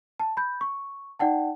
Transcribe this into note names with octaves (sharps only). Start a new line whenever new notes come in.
A5
B5 G6
C#6
D#4 D5 F#5 G5 A5